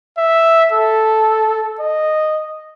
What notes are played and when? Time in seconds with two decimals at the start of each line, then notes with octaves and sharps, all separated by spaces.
0.18 E5
0.72 A4
1.80 D#5